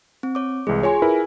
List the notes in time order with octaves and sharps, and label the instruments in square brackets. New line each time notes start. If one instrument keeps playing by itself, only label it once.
[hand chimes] C4
C#5 D6
[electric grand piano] C2 E3 G#3 [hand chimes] G#4
[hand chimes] F4 G#4 G#5 [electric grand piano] C#5 C6
[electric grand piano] E4 A#4 B4